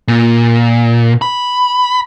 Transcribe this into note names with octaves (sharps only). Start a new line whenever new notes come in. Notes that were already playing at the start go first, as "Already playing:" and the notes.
A#2
B5